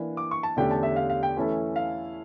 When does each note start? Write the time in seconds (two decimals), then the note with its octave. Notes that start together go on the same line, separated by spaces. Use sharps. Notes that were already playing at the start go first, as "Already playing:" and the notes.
Already playing: E3 A#3 D4
0.17 D6
0.31 C#6
0.43 A5
0.56 E2 D3 A3 C#4 G4 G5
0.71 A5
0.83 E5
0.96 F5
1.10 F5
1.23 G5
1.37 E3 A3 C#4 E4 A4
1.76 F5